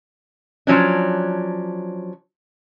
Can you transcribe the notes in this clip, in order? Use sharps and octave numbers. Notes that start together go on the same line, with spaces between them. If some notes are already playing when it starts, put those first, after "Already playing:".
F3 F#3 C#4 D4